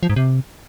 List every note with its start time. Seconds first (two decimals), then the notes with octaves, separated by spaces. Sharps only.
0.03 F3
0.10 G#2
0.16 C3